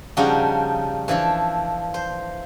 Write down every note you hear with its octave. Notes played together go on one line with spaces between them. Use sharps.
C#3 F3 G3 D4 D#4 F#4
E3 F3 D4 A4
C5